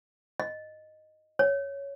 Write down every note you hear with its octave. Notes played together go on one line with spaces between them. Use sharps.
D#5
C#5